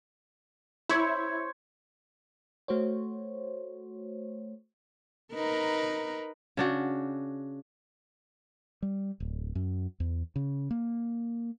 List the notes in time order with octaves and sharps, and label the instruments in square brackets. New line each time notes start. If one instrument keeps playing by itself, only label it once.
[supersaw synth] E4 [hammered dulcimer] C5 C#5
[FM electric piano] A3 F#4 C5 C#5
[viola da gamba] D#4 A#4 B4
[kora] C#3 D4 F#4
[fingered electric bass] G3
D1
F#2
E2
C#3
A#3